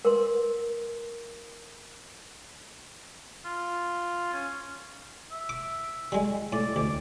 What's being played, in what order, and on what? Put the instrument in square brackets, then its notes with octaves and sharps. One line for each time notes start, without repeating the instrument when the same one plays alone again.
[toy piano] A#4 B4 C6
[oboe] F4
C#4
E5
[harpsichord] D6
G3 G#3
[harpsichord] A2 [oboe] D5
[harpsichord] D2 [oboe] D6